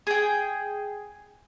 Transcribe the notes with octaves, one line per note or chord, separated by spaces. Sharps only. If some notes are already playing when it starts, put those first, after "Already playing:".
G#4 G5